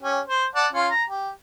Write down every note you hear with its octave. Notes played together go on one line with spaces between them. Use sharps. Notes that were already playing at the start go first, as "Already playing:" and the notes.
C#4 G4
C5
D5 F#5 A5
C#4 F4
A#5
G4